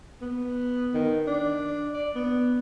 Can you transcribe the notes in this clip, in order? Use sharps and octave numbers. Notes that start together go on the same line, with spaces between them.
B3
D#3
D4
D5
B3